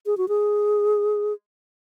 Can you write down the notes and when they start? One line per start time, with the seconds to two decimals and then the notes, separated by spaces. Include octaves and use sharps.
0.06 G#4
0.18 F#4
0.28 G#4